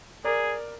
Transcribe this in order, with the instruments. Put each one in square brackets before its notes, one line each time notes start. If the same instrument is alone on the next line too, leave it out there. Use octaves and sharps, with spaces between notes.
[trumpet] G#4 [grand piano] A#4 D5